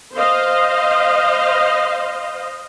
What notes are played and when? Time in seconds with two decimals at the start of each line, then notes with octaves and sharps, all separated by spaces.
0.15 C5 D#5 F5